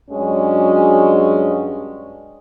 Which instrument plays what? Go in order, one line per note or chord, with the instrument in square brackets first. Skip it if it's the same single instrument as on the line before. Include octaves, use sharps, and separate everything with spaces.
[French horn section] G2 F#3 G#3 C#4 D4 F#4